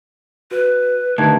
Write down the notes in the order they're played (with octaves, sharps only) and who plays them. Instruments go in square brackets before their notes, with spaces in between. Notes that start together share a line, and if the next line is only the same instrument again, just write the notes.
[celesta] F#4 [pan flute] B4
[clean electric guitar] D2 [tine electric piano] D#3 D#4 G4 [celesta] A5 G#6